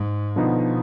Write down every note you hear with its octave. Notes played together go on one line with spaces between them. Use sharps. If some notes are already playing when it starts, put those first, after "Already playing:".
Already playing: G#2
B2 D3 F3 B3 D#4